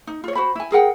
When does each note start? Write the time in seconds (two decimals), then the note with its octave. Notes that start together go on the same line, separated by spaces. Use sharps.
0.07 D#4
0.24 F4 C#5
0.35 F#4 C5 B5
0.55 E4 G#5
0.72 G#4 A#4 F#5 G5